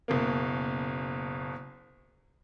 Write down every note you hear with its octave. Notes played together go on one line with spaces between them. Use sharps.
F#1 B2 A#3